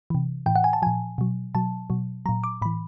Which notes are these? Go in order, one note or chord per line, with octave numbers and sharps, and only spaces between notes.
C3 E3
A2 E3 G5
F#5
G#5
A5
A#2 F3 G#5
B2 F#3
B2 F#3 A5
B2 F#3
A#2 F#3 A#5
D6
A2 E3 B5